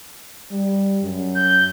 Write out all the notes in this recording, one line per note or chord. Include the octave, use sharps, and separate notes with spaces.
G3
F#2
G6